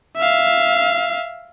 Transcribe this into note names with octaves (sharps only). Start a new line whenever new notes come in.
E5 F5